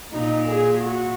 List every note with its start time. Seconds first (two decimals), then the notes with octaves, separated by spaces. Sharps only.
0.12 A#2 D#4
0.47 G#4
0.81 F#4